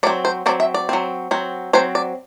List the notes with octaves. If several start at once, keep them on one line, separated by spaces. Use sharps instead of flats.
F#3 C4 D5
C5
F#3 C4 D5
E5
D5
F#3 C4
F#3 C4
F#3 C4 C5
D5